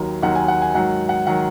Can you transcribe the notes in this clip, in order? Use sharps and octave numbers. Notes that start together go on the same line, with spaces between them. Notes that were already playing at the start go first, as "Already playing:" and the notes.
Already playing: D#2 D#3 F#3
D#2 D#3 F#3 F#5
G#5
F#5
G#5
G#2 D#3 F#3 F#5
F#5
D#3 F#3 F#5